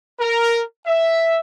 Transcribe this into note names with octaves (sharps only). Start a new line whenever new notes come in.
A#4
E5